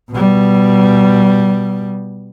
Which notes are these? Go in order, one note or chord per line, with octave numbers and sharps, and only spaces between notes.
B2 G3